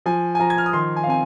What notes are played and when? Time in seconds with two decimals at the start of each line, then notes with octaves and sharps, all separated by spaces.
0.06 F3 G#5
0.35 G#5
0.39 F3 A#5
0.50 G#6
0.58 F6
0.66 D#6
0.73 D#3 C6
0.96 G#5
1.04 F5
1.07 C4 G#5